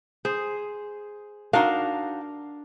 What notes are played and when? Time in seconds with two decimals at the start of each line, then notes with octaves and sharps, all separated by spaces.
0.25 G#4 C5
1.53 D4 D#4 F#4 A#4 F5